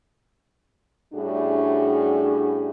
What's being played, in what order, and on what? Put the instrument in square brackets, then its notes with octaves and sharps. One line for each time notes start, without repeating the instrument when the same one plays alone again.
[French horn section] A2 G3 C#4 D4 F#4 G#4